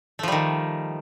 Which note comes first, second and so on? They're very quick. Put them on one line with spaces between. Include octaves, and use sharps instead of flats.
A3 F3 G3 D#3